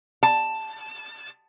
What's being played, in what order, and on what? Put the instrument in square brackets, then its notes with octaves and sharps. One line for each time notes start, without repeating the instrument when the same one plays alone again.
[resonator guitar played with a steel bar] A5